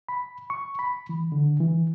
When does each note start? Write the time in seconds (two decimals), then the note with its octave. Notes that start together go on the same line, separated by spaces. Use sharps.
0.09 B5
0.50 C#6
0.79 B5
1.09 E3
1.32 D3
1.60 E3